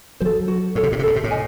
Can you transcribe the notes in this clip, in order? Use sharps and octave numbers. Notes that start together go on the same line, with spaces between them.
F#3 A4 C5
F#4
A2 A4 C#5
C3
A2
C3
A2 A4
C3
A2
D#5 G#5